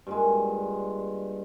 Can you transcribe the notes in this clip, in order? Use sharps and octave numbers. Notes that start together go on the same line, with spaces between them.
G2 A#2 G#3